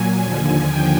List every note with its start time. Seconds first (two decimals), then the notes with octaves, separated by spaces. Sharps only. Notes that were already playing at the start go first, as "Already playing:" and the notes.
Already playing: A#2 F#3 G#5
0.23 D#2 D3 F3
0.69 G5